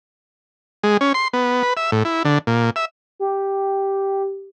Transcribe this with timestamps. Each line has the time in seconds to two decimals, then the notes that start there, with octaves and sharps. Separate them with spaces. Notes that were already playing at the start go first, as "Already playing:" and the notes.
0.83 G#3
1.01 C#4
1.14 C6
1.33 B3
1.63 B4
1.77 E5
1.92 A2
2.05 E4
2.25 D3
2.47 A#2
2.76 E5
3.20 G4